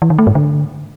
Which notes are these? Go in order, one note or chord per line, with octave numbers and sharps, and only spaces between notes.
E3
D#3
A3
G#2
D3